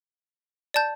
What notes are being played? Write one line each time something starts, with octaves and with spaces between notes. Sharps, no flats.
D5 A5 G6